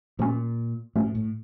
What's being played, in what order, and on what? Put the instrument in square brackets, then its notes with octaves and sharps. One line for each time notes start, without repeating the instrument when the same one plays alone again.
[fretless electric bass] A#2 [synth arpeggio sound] F3 A3 C#4 F#4
[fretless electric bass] A2 [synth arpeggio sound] F3 A3 C#4 F#4
[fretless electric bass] A2